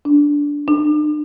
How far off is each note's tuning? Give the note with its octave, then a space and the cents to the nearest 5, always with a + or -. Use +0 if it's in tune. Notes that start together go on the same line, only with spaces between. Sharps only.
D4 -10
D4 +40